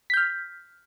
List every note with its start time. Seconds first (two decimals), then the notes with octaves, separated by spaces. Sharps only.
0.10 B6
0.14 G6
0.17 F6